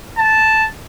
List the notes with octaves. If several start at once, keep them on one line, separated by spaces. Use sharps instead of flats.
A5